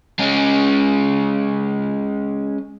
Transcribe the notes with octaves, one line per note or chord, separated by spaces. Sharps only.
G#3 C#4